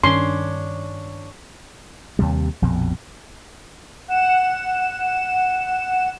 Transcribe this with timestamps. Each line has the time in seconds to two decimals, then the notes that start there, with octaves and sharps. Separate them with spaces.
0.04 G2 D#3 C#4 D4 C6
2.19 D#2 C3 G3
2.62 A#1 F2 B2
4.08 F#5 E7